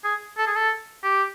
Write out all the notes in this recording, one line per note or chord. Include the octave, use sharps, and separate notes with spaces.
G#4
A4
G#4
A4
G4